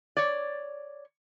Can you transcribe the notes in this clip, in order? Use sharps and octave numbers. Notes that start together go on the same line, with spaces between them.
C#5 D5